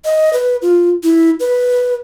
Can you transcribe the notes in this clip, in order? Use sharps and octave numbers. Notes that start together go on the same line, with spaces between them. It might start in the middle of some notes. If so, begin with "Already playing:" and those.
D#5
B4
F4
E4
B4